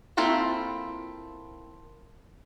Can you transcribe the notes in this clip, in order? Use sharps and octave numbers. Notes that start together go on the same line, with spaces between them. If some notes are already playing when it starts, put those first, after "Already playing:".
A#3 C4 E4 F4 A4